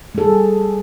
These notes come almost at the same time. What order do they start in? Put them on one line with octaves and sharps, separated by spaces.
A3 A4 G#4 G3